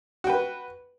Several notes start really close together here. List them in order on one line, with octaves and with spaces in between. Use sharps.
F#4 G5 B4